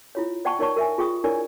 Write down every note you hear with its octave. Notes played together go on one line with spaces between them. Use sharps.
E4 F4 C#5
C5 D5 F#5 G5 A5 C#6
D#4 A#4 C#5 D5 A5 C#6
A#4 E5 G#5
F4 G#4 G5 C#6 D#6
D4 E4 A#4 C#5 D5 G#5